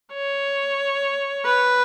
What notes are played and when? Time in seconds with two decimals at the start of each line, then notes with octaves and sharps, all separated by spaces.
0.14 C#5
1.46 B4